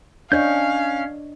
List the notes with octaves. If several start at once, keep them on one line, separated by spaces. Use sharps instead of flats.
C#4 D4 C#5 D#5 F5 G6